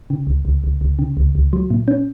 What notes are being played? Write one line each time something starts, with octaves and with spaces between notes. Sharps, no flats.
C#3
C#2
C#2
C#2
C#2
C#3
C#2
C#2
F#3
A#2
C#4